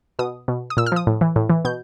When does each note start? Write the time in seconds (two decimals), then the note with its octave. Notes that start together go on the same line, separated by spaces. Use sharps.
0.19 B2 D#6
0.48 B2
0.70 D#6
0.77 A#2 E6
0.86 F6
0.92 F3 D#6
1.07 A2
1.21 E3
1.36 A2
1.50 E3
1.65 B2 G6